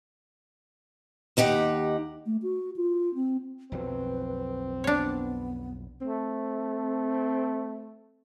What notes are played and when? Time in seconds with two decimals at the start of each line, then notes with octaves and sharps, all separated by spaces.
1.37 D#2 D#4 G4 F#5
2.26 A3
2.43 F#4
2.76 F4
3.15 C4
3.72 B1 F2 F#3 C4 B4
4.84 B3 D4 C#5
6.01 A3 C4